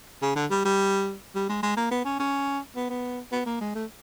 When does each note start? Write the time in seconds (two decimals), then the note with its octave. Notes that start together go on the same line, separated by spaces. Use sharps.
0.22 C#3
0.36 D3
0.51 G3
0.65 G3
1.35 G3
1.49 G#3
1.63 G#3
1.77 A#3
1.91 B3
2.05 C#4
2.19 C#4
2.76 B3
2.90 B3
3.32 B3
3.46 A#3
3.61 G#3
3.75 A3